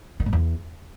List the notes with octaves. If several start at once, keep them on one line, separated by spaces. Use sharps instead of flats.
D#3
G#2
E2